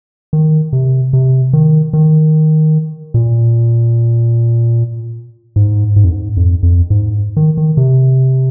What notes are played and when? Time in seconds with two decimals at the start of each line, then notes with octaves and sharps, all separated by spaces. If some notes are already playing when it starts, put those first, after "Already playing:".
0.33 D#3
0.73 C3
1.13 C3
1.53 D#3
1.93 D#3
3.14 A#2
5.56 G#2
5.96 G#2
6.04 F2
6.12 G#2
6.37 F2
6.63 F2
6.90 G#2
7.37 D#3
7.57 D#3
7.77 C3